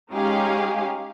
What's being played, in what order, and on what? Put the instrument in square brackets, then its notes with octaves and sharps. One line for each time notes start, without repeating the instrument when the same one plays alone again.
[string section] G#3 C#4 D#4 G4 G#4 F5